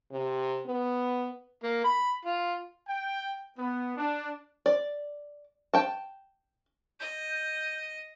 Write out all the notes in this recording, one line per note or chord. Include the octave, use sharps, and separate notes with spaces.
C3
B3
A#3
B5
F4
G5
B3
D4
D5
G5 A5
D#5 G6